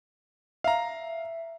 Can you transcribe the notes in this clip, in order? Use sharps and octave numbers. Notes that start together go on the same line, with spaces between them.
E5 F5 A#5